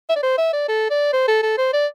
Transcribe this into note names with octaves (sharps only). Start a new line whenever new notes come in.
E5
D5
C5
E5
D5
A4
D5
C5
A4
A4
C5
D5